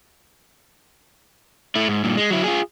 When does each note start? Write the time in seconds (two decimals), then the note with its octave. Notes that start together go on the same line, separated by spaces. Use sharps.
1.76 A3 E4
1.88 G#2
2.04 G2 A#2
2.17 G#3
2.30 F#3 E4
2.44 F4 G#4